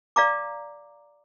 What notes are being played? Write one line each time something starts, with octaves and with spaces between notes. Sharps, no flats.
D5 F5 A#5 D6